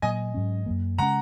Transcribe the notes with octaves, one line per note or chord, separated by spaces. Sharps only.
A#2 F#3 A#3 D#5 G#5
G#2 F#3 C#4
F#2 F#3 A#3
C#3 G#3 C#4 F#5 A#5